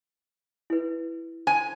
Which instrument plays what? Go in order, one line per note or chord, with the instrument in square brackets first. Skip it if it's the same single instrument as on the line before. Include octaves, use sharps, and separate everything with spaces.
[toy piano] E4 B4
[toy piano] C5 A5 [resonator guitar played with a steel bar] G#5